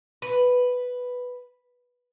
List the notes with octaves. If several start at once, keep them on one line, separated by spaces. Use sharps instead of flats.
B4